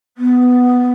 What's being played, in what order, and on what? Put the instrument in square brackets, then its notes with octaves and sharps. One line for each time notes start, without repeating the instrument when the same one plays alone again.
[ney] B3